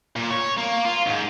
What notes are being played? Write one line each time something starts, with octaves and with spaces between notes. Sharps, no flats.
A#2
C#5
A#3
F4
G#2